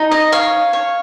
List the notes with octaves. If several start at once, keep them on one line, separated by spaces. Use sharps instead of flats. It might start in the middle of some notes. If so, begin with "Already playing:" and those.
Already playing: D#4
D#5
C#5 F5
C#5